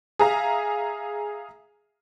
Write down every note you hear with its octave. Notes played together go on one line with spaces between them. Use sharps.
G#4 E5 F5 A#5